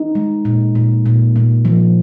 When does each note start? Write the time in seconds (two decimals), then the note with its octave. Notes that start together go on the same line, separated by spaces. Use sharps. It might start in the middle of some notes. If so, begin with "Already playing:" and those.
Already playing: D#4
0.15 G#3
0.45 A#2
0.75 A#2
1.06 A#2
1.36 A#2
1.65 F3